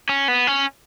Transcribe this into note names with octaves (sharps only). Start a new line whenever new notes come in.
C#4
B3
C#4